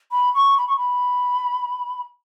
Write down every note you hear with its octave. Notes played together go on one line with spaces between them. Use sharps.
B5
C#6
B5
C#6
B5